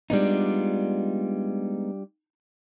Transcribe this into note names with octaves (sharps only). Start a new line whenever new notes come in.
G3 G#3 B3 D4 D#4 F4